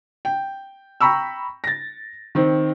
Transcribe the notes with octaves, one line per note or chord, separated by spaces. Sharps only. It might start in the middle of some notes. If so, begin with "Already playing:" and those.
G5
G5 A#5 B5 C#6 E6
A6 A#6
D#3 C4